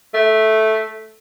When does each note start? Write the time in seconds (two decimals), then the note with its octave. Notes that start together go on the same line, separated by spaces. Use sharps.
0.14 A3